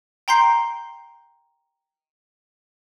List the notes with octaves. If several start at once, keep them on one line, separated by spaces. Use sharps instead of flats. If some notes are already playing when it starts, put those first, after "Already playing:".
G5 A#5 C6 G6 C7